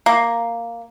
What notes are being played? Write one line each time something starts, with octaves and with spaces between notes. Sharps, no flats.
A#3